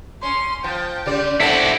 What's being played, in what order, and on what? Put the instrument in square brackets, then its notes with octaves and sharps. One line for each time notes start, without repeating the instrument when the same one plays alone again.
[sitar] C#4 [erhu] C6
[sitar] F3 [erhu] G5
[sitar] C#3 G3 D5
[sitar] C4 D4 A4 [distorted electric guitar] E4 G4 [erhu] F#5